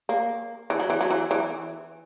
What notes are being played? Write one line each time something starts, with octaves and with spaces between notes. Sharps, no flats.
A#3
E3
F#3
E3
F#3
E3
E3